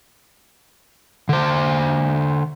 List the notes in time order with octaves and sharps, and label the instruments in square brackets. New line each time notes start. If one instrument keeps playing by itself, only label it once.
[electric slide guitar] D3 C5